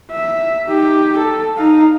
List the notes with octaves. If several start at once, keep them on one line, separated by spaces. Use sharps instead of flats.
E5
D#4 G4
A4
D#4 F5